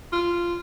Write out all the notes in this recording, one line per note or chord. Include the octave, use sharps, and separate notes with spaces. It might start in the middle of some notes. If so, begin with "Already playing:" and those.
F4